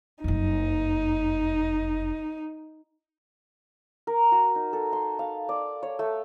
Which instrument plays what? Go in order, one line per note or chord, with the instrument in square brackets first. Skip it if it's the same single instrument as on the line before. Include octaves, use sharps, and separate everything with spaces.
[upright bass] F#1 F2 [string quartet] D#4
[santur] A#4
F#4
D#4
A4
C6
F5
D5
C#5
A3